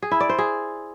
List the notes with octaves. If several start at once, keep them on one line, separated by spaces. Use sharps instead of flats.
G#4
E4
D5
C5
G#4